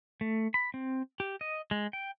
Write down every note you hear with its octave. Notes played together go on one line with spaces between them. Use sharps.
A3
B5
C4
G4
D#5
G#3
G5